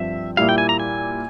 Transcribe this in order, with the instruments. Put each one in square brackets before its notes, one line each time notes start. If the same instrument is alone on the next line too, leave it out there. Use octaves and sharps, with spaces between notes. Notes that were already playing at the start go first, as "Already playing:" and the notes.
Already playing: [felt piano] G2 F3 C4 [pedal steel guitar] E5
[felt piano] A#2 G3 A#3 E4 [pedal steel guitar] F5
[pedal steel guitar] G5
G#5
A#5
G#5